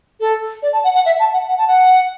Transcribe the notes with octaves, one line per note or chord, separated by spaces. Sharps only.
A4
D5
A5
F#5
F#5
E5
A5
F#5
F#5
A5
F#5